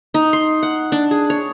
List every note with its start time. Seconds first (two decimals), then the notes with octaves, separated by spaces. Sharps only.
0.14 D#4
0.33 C6
0.63 F#5
0.92 D4
1.11 G#4
1.30 C#5